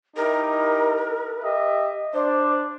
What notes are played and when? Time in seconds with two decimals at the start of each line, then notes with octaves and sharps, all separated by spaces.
0.16 D#4 E4 G4 A#4
1.43 G4 D#5 E5
2.14 D4 C5 D5